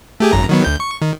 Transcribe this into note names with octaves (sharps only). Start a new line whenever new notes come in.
A3 G4 G#4
G#1 F#2 A#5
D#3 F#3 B3
D2 G6
C#6
D#3